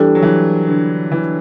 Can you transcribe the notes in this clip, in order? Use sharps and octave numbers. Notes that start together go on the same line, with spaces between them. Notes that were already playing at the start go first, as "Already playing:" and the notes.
Already playing: E3 G3 D4 A4
F#3
E3
D3
E3